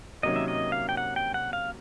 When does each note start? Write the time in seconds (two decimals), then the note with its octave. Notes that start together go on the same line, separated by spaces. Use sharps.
0.23 C3 D#3 F#3 A#3 C#4 D#5
0.36 E5
0.48 D#5
0.72 F5
0.89 G5
0.97 F#5
1.16 G5
1.34 F#5
1.53 F5